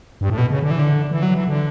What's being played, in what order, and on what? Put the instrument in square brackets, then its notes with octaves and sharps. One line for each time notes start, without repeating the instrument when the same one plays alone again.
[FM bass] G2
A2
B2
C#3
D3
E3
D3
E3
F#3
E3
D3